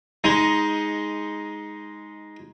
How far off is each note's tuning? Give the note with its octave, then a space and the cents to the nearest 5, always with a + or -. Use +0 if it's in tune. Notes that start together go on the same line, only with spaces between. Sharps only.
G#3 +0 D#4 +15